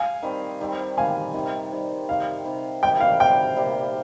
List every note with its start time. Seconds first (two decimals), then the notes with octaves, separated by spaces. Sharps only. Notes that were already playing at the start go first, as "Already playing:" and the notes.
Already playing: F5 G#5
0.22 D#3 G3 C4
0.60 D#3 G3 C4
0.97 D#3 G3 C4 F5 G#5
1.34 C3 D#3 G3
1.71 C3 D#3 G3
2.09 C3 D#3 G3 F5
2.45 C3 D#3 G3
2.83 C3 G3 A#3 G5
3.00 F5
3.20 C3 G3 A#3 G5
3.57 C3 G3 A#3